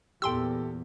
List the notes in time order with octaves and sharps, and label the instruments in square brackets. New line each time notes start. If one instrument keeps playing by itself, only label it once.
[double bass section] E2 A#2 [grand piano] G4 A4 [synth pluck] G5 C6 E6